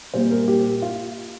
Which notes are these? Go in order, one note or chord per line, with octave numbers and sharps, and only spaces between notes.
A#2 G3 A#3 C5
A#4
G4
F4